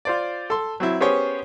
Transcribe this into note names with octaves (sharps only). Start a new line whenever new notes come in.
F4 C5 D5
A4 C6
F#3 C4 E4
B3 C#4 G4 G#4 C5 C#5